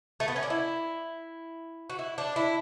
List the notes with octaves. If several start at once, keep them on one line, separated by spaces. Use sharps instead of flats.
A3
B3
C#4
D4
E4
F#4
E4
D4
E4